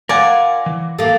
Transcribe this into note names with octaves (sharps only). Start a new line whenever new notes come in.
F4 A#4 D5 F#5 G#5
E3
A3 A#3